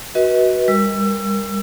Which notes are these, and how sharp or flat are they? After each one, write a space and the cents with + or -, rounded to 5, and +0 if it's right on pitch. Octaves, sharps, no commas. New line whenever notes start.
F#4 +10 B4 -25 D#5 +35
G3 +35 A#4 +0 E6 +30